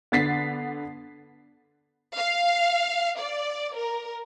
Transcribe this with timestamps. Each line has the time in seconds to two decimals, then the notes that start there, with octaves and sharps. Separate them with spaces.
0.12 D3 B3 A6 B6 C7
2.17 F5
3.19 D5
3.75 A#4